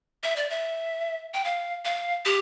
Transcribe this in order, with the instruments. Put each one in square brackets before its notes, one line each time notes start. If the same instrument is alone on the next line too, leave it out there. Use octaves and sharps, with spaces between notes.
[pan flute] E5
D5
E5
G5
F5
F5
G4